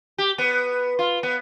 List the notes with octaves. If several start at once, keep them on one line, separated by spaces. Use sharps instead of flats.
G4
B3
F4
B3